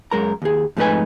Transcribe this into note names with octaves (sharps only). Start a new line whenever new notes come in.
F#2 G#3 A#4 A#5
D#2 G#4
F2 G#2 A3 D#4 B4 G#5